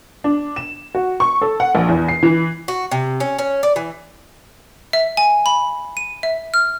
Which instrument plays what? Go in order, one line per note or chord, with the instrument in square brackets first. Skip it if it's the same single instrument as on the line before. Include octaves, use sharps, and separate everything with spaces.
[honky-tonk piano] D4
E7
F#4
C#6
A4
F#5
A#1
E2
C7
E3
[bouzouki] F#4
C3
C#4
C#4
D5
E3
[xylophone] E5
G#5
B5
D#7
E5
F6